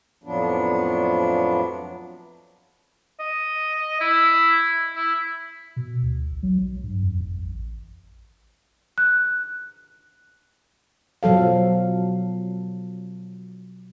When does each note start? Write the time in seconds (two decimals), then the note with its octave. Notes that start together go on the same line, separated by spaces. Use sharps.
0.24 F2 A2 F3 F#3 B3 D4
3.20 D#5
4.01 E4
4.96 E4
5.76 B2
6.03 D2
6.30 A1
6.43 F#3
6.58 B1
6.83 G2
7.03 F2
7.21 F#1
7.39 A1
8.98 F#6
11.23 B2 F3 F#3 A4 F5